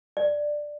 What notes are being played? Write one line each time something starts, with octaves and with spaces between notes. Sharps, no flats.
D5